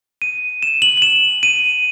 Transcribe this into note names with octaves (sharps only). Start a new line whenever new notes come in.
D#7
E7
F#7
F#7
E7
D#7